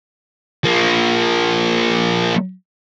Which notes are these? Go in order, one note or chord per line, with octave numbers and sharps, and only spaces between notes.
F3 A#3